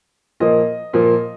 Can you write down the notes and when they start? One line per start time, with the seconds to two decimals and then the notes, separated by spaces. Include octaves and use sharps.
0.40 A#2 F3 A#3 D#5
0.93 A#2 F3 A#3